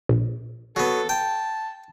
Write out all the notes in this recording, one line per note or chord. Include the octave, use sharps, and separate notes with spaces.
A#1
F#3 B3 A4
G5 A5